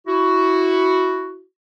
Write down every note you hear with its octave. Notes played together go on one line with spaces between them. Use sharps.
E4 F#4